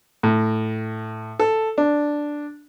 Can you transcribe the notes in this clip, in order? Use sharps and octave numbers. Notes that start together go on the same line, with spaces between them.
A2
A4
D4